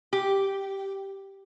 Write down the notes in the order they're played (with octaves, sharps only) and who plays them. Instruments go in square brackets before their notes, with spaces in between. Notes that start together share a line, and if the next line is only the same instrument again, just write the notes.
[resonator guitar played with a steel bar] G4